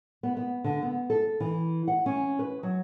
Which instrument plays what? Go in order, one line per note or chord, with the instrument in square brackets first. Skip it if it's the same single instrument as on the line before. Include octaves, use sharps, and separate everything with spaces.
[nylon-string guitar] B3
B3
D3
B3
A4
E3
F#5
C#4
B4
F#3